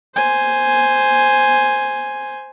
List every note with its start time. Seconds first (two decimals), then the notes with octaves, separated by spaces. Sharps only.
0.15 C5 G#5